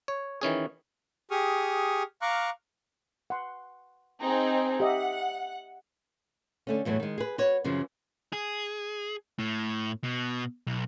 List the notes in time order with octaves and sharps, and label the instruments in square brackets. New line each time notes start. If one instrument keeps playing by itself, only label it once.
[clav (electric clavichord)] C#5
D#3 E3 C#4 G#4
[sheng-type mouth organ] G4 G#4 C#6 D#6 F6
F5 A#5 C#6 D6 F6 F#6
[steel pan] F#5 C6
[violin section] C4 D#4 G#4
[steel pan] G4 D#5 E5 [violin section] F#5
[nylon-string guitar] D3 A3 C#4
E2 A2 E3 F#3
D#3 G#3
G#4 B4
F#4 B4 C#5
F#2 C#3 E3 F3
[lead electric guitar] G#4
A2
B2
B1